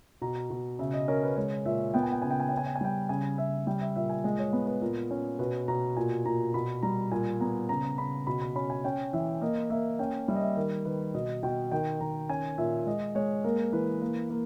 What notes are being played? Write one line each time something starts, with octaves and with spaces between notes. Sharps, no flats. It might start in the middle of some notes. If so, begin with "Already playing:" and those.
B2 A#5
B2
C#3 E5
D#5
C#4 A#4
B4
G#3 C#5
A#2 E5
B3 G5
G#5
G5
C#3 G#5
G5
G#5
C#4 G5
G#5
G5
G#5
G3 G5
C#3 G#5
C#3 E5
G3 G5
E5
A#2 E5
G#5
G#3 D#5
C#5
B3 B4
B4
A#2 A#4
C#4
B2 B4
B2 A#5
A#2 G#5
A#2 A#5
B2 B5
G3 A#5
A#2 G#5
B3 A#5
C#3 A#5
C#3 B5
B2 B5
B5
C#4 B5
G#5
C#4 G5
E3 E5
A#3 D#5
A#3 E5
C#4 G5
G3 E5
D#5
E5
D#3 A#4
D#3 B4
B2 D#5
B2 G5
D#3 G5
D#3 A#5
C#4 G#5
A#2 E5
G#3 D#5
G#3 C#5
A#3 A#4
E3 B4
A#3
A#3